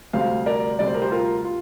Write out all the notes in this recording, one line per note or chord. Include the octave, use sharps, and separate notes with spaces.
D2 C3 G3 C5 F5
A#4 D5
D2 C3 G3 D5
C5
A#4
G4 C5
F4 A#4
F4